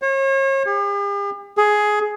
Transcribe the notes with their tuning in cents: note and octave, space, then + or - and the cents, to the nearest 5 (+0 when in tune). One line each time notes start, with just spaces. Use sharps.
C#5 -40
G4 +45
G#4 +10